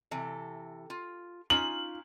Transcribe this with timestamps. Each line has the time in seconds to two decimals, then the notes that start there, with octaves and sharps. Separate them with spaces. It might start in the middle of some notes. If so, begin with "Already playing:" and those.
0.11 C3 E3 A4
0.90 F4
1.50 C#4 D#4 F4 F#7